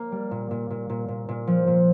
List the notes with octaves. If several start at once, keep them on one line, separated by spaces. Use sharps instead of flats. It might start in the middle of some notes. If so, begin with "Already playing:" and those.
Already playing: A#3
G3
A#2
A#2
A#2
A#2
A#2
A#2
F3
A#2